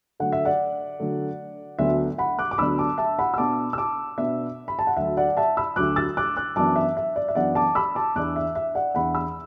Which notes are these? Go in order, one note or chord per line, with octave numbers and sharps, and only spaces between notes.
D3 F#3 A3 F#5
E5
D5 F#5
D3 F#3 A3
D2 D3 F#3 B3 D4 E5
F#5 B5
D6 F#6
D6
D2 D3 F#3 B3 D4 B5 E6
A5 D6
E5 A5
F#5 B5
E6
B2 B3 D4 A5 D6
E6
A5 D6
B2 B3 D4 E5
B5
A5
F#5
D2 D3 F#3 E5
D5 F#5
E5 A5
B5 E6
D2 D3 F#3 D6 F#6
E6 A6
D6 F#6
D6 F#6
F#2 E3 B3 D4 A5 D6
E5
E5
D5
E5
F#2 E3 B3 D4 D5 F#5
A5 D6
B5 E6
A5 D6
E2 E3 D4 D6 F#6
E5
E5
D5 F#5
E2 E3 D4 F#5 B5
B5 E6